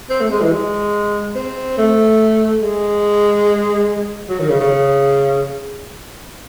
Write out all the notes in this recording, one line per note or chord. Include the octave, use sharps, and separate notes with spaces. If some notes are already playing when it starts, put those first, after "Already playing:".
C4
A3
G#3
E3
G#3
C4
A3
G#3
F#3
D#3
C#3
C#3